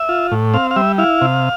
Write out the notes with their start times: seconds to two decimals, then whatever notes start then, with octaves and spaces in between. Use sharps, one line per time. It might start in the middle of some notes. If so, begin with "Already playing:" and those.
Already playing: E5
0.09 F4
0.32 A2
0.54 C4 F5
0.71 F5
0.76 G3 E5
0.98 E4 F5
1.21 C3